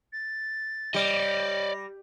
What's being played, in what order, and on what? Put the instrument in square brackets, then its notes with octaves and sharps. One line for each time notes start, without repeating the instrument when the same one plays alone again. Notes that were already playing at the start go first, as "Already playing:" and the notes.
[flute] A6
[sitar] G3 [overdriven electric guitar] D5 D#5 [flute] A#6